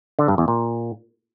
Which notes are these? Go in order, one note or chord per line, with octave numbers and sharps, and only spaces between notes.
D3
G2
E2
A#2